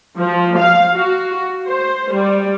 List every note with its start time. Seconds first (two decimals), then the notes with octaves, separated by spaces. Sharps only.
0.20 F3
0.58 F5
0.95 F#4
1.67 C5
2.13 G3